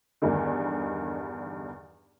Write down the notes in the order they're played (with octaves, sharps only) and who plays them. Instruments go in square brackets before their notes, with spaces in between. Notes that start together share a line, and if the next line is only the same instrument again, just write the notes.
[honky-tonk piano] E2 G2 D3 D#3